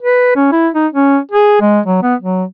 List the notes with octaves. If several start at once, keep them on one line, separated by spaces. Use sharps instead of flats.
B4
C#4
E4
D#4
C#4
G#4
G#3
F#3
B3
F#3